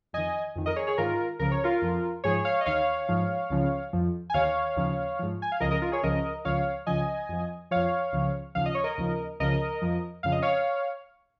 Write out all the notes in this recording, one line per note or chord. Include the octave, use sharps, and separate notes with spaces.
F2 D#3 D#5 G#5
F2 D#3
A#4 D#5
G#4 C#5
G#4 C#5
G#2 D#3 F4 A#4
C#2 C#3 F3 A#4
C#5
F4 A#4
F2 F3
G#2 F3 G#4 C#5
C#5 F5
D#5
D#2 D#3 C#5 F5
G#2 F3
C#2 C#3 F3
F2 F3
G#5
D#2 D#3 C#5 F5
D#2 C#3 F3
G#2 F3
G#5
F5
C#2 C#3 F3 A#4 D#5
A#4 D#5
F4 A#4
G#4 C#5
C#2 C#3 F3 A#4 D#5
C#2 C#3 F3 C#5 F5
C#2 C#3 F3 D#5 G#5
F2 F3
F2 F3 C#5 F5
C#2 C#3 F3
D#2 C#3 F3 F5
D#5
C#5
A#4 D#5
D#2 C#3 F3
C#2 C#3 F3 A#4 D#5
F2 F3
F2 C#3 F3 F5
D#5
C#5 F5